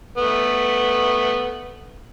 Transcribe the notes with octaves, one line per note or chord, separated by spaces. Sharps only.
A3 B3